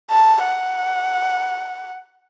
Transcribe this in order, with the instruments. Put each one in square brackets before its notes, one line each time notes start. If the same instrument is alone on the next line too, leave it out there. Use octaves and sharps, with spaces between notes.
[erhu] A5
F#5